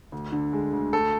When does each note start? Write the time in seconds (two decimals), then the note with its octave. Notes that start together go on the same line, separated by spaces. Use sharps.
0.12 D2
0.32 D3
0.53 G#3
0.73 D2
0.93 A3 A4